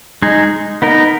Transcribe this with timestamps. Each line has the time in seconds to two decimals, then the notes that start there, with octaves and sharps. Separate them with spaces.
0.22 G#3 D#4 G#4
0.82 B3 D#4 A#4